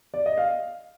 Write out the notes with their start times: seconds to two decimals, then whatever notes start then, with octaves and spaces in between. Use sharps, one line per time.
0.14 D5
0.26 D#5
0.38 F5